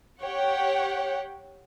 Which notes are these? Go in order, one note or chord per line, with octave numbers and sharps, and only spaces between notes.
G4 C#5 F#5 G5